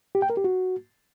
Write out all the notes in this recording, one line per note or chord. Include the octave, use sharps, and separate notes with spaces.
G4
G5
A#4
G4
F#4